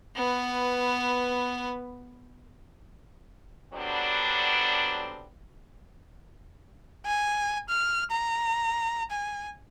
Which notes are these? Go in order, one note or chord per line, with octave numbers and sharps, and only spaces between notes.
B3 B4
D3 F#3 G3 B3 C4 D4
G#5
F6
A#5
G#5